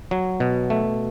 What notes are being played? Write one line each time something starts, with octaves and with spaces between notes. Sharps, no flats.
F#3
B2
A3